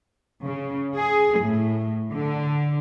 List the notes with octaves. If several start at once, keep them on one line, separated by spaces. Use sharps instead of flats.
C#3
G#4
A2
D3